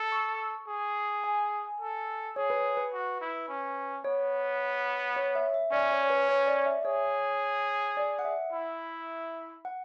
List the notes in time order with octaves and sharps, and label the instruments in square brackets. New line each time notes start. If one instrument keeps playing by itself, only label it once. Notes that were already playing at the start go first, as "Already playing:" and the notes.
Already playing: [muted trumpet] A4
[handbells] C#6
[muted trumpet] G#4
[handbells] G#5
[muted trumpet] A4
[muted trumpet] G#4 [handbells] C#5
[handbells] B4
B4
[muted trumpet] F#4
E4
C#4
[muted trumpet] B3 [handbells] C#5
[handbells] C#5
E5
E5
[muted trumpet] C#4 [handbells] D5
[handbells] C#5
C#5
B4
C#5
D5
E5
[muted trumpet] G#4 [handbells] C#5
[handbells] D5
F#5
E5
[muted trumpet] E4
[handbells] F#5